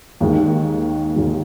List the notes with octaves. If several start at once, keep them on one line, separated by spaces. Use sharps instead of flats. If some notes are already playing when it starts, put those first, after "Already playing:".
D#2 D#3 G#3
D#2 D#3 G#3